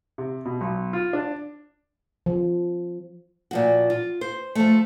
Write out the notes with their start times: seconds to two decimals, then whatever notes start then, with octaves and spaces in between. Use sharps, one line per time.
0.18 C3
0.45 B2
0.61 B1
0.93 F4
1.13 D4
2.26 F3
3.51 A#2 F3 F#4
3.90 F4
4.21 C5
4.55 F3 A3